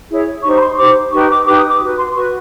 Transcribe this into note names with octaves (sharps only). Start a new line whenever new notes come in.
E4 G#4 C#5
D#4 G4 C5 C#6
B5
C6
D#4 G4 C5 D6
D#4 G4 B4 C#6
D6
D#4 G4 B4 D6
D#6
D6
F#4 B4
C6
F#4 B4 C#6